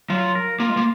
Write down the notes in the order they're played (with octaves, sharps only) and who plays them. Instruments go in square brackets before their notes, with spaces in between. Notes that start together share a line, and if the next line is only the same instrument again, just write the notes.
[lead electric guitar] F#3 [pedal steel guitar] F4
[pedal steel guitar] A#4
[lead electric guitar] A#3 [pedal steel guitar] F4
[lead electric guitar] G#3
A#3